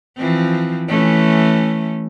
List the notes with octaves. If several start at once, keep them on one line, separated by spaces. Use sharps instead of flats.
E3 F3 C4
E3 A3 C#4